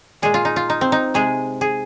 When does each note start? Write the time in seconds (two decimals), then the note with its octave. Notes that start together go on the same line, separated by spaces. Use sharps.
0.22 A#2 G#3 G#4
0.34 F4
0.45 D#4
0.56 F4
0.70 D#4
0.81 C4
0.92 D#4
1.14 C3 G#3 G#4
1.61 G#4